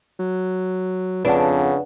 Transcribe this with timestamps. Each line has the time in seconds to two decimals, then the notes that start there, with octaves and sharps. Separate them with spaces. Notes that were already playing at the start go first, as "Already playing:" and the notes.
0.19 F#3
1.25 F2 C#3 D4 B4 F#5